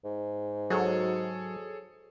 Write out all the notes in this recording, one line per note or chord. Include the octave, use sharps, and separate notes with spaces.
G#2
F#3 G#4 A4 C#5